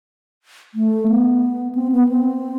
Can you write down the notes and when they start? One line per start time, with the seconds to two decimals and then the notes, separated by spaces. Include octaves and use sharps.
0.74 A3
1.08 B3
1.75 C4
1.92 B3
2.09 C4